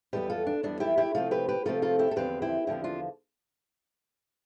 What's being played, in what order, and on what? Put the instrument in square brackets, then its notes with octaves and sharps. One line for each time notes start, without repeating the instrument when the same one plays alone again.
[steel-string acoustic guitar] F2 E3 G3 B3 G4 B4
F4 A4
D4
F2 E3 G3 B3 D4
E4 G4
E4 G4
C3 F3 A3 C4 F4 A4
G4 B4
G4 B4
C3 F3 A3 C4 F4 A4
F4 A4
E4 G4
A4
E2 D3 F3 C4 G4 B4
E4 G4
E2 D3 F3 C4 E4 G4
D4 F4